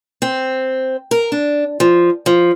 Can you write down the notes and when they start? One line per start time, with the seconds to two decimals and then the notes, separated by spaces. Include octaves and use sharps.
0.22 C4
1.11 A#4
1.32 D4
1.80 F3
2.26 F3